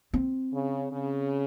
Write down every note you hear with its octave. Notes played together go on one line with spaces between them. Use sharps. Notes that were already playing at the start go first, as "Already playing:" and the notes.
C4
C#3
C#3